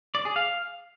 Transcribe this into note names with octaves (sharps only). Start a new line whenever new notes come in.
D5
G#4
F5